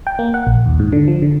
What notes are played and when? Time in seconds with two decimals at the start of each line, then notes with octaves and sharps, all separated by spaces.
0.07 G5
0.19 A#3
0.34 F#5
0.47 A#1
0.66 D#2
0.79 G#2
0.92 D3
1.08 F3
1.22 D3